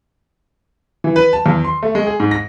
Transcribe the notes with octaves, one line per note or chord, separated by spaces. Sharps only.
E3
B4
A5
E2
C6
A3
G#3
G#4
G#2
A#6